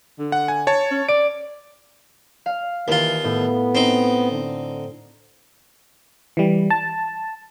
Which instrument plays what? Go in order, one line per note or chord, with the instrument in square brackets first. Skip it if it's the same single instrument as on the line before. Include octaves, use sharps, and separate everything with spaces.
[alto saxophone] D3
[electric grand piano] F#5
G#5
C#5 A5
[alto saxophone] C#4
[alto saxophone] D5 [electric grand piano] D7
[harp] F5
[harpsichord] D#2 F4 [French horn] E3
[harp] A2 [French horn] B3
[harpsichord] C4 D#4
[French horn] D3
[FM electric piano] E3 G3
A5